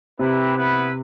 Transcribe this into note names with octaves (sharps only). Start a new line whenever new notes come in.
C3 C4 E4 G4 B4
B3 E4 B4